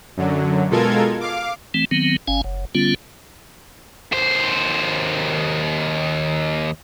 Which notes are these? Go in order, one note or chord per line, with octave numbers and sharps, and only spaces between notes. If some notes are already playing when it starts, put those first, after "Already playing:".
F#2 D3 F#3
B2 G#3 F4 A4 A#4 G#6
F5 D6
E3 A3 C4
D#3 F#3 B3 C4
G1 C#4 F5 G#5
F#1
D3 G3 B3 C#4 F4
D#2 C5